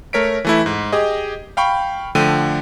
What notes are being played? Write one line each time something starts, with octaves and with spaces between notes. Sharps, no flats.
A3 A#4 C#5 B6 D7
E3 A3 E4
G#2
G4 G#4 D#5
F5 G5 B5 C#6
D3 F3 A3 G5 D#7